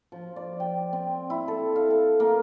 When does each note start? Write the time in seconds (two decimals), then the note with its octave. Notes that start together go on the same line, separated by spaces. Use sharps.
0.12 F3
0.36 D5
0.60 G5
0.93 C4
1.30 E4
1.48 A4
1.76 F5
1.90 A4
2.20 A#3